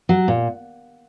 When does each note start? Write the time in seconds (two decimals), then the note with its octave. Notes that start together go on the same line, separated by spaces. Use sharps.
0.09 F#3
0.28 A#2